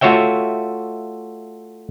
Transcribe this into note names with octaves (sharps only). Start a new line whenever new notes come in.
A3 F4 F#4 C#5 E5 G5